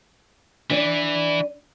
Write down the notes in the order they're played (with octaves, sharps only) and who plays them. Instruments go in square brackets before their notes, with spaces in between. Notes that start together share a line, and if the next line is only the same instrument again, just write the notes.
[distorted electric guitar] E3 [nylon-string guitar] D4 D5